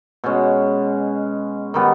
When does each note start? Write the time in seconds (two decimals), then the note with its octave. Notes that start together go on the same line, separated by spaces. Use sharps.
0.24 B2 G#3 C#4
1.74 D#3 G3 B3